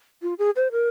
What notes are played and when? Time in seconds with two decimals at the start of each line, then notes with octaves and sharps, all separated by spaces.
0.22 F4
0.39 G#4
0.56 C5
0.72 A#4